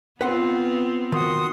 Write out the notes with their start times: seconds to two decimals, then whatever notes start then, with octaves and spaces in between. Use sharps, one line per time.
0.21 B3 C4 F4 B4 F#5 C6
1.12 D#3 F#4 C6 D#6